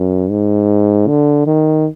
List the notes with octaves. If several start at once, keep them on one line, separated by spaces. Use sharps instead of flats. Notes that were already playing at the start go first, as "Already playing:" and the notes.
Already playing: F#2
G#2
D3
D#3